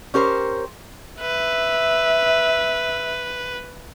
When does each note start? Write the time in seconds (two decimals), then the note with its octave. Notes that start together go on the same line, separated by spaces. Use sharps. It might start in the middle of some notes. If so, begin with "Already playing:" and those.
0.14 C#4 G4 A#4 C5
1.21 B4 E5